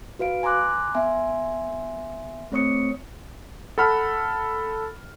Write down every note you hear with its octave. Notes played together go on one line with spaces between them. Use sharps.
F#4 B4 F5 D7
G#5 A#5 C6 D6 F#6
B3 E5 G#5 C6
A3 C4 C#5 C#6 D#6 C#7
A4 F#5 B5 F6